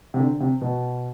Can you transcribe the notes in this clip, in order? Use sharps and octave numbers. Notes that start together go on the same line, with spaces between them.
C3
D3
C3
B2